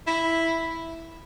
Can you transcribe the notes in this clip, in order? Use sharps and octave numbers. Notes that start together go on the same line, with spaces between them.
E4